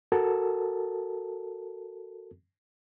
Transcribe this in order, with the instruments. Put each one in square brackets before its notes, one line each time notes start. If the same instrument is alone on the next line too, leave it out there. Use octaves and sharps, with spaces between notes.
[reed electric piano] F#4 A4 A#4 A5